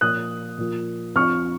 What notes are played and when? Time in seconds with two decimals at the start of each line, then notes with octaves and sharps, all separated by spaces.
0.01 A#2 F3 D#6 F#6
0.58 A#2 F3
1.15 F2 F3 C#6 F6